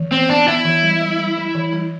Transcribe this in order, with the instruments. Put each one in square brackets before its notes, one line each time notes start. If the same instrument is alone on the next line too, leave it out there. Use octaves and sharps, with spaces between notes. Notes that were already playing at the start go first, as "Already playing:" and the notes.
Already playing: [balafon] E3
[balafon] B3 [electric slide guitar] C4
[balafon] B3 [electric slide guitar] D4
[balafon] B3 [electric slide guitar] E4
[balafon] E3
G3
G3
G3
G3
E3
G3